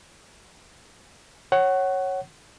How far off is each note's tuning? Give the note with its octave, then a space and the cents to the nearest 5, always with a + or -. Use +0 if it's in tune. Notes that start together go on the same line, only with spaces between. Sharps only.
C#5 -10 F#5 +20